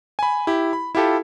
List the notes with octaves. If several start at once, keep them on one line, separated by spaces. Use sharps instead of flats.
G#5 B5
E4 G4
B5
E4 F4 G4 A4